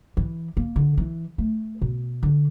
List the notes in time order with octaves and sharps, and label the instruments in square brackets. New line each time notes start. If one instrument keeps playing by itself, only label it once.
[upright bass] E3
A#3
D3
E3
A3
B2
D3